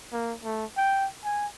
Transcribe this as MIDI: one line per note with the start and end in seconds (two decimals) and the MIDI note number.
0.12 0.34 58
0.44 0.65 57
0.77 1.07 79
1.24 1.47 80